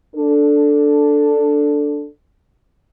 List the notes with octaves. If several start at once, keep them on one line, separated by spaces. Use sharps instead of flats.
D4 A4